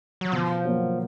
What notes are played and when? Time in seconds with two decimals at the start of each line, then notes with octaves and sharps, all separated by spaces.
0.21 F#3
0.32 B2 F3
0.64 F#3 A#3